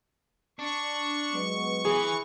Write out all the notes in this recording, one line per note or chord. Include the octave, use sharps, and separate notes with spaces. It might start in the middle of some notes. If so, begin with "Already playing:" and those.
D4 C#6
F#3 G#3 B3
E3 G#4